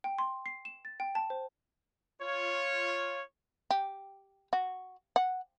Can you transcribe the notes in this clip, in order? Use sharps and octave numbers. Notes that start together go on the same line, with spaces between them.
G5
C6
C7
E7
A6
G5
A5
C5
F4 C#5
G4
F#4
F#5